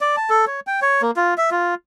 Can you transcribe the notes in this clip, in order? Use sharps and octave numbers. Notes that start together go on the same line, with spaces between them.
D5
A5
A4
C#5
G5
C#5
A#3
F4
E5
F4